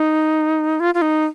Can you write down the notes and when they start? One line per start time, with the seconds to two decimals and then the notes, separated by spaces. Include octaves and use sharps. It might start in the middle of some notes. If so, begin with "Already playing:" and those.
Already playing: D#4
0.80 F4
0.94 F4
1.02 D#4